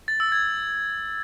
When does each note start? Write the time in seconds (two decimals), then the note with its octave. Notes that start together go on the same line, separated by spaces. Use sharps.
0.08 A6
0.20 E6
0.32 G#6